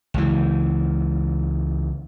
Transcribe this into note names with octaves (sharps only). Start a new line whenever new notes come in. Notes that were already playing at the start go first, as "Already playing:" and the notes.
C#2 E3